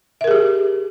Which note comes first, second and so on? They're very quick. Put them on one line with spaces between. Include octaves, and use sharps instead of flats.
E5 A#4 G#4 G4